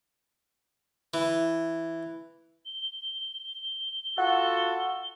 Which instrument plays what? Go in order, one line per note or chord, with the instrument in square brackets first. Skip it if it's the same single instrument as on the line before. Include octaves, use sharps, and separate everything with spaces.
[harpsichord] E3
[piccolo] G7
[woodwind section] F4 F#4 A4 [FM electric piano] F#5